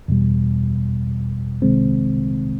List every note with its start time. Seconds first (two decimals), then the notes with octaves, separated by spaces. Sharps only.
0.08 E2 B2 G3
1.62 C2 C3 D#3 G#3 C4